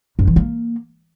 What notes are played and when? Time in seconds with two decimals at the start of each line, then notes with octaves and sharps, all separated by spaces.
0.19 F#2
0.27 E3
0.36 A#3